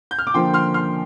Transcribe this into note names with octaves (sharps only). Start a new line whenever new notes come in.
G6
F6
D6
D3 F3 A#3 G5 C6
C6 F6
C6 F6